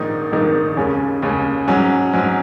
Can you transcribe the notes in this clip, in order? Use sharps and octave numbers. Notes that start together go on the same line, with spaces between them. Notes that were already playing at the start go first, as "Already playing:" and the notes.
Already playing: A#1 G#2 D#3 A#3 D#4
A#1 G#2 D#3 A#3 D#4
D#2 C#3 G#3 C#4
D#2 C#3 G#3 C#4
G#2 F#3 C#4
G#2 F#3 C#4